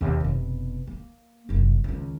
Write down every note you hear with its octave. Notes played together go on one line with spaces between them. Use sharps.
D#2 B2
F1 B2
A#3
F#1 C2
C#2 D#3